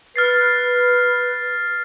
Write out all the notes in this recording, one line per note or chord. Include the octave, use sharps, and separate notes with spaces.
B4 F6 A6 C7